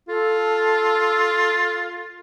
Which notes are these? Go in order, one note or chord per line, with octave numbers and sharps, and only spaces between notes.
F4 A4